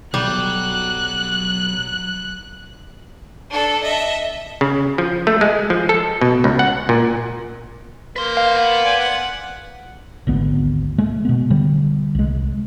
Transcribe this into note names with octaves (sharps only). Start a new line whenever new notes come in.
B1 F#3 G3 F#6
D4 A4
D#5 E5
C#3
F3
A3
G#3
F3
A4
B2
C#2
F#5
A#2
A#3 B4 C6
F5
B3
C5 D5 G#5
F#5
G#1 D2 B3
G#3 A3
B2 B3
D3 G3
C2 G#3